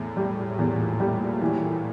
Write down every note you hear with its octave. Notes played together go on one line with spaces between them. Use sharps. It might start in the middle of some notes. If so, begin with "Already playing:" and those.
Already playing: E2 A2
G3
E2 A#2
G3
E3